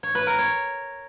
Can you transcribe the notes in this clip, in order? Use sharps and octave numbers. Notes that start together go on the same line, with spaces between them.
C#5
B4
A#4
C#5